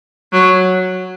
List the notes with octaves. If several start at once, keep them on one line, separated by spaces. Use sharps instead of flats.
F#3